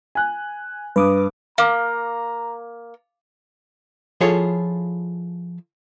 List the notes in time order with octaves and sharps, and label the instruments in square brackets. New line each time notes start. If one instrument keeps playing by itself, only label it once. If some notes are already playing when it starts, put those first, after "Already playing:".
[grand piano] G#5 F#6
[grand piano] G2 [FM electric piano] B4 D6 D#6
[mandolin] A#3 [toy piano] F5 D6 [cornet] A#5
[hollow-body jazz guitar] F3 E4 F4 G#4 A4 C#5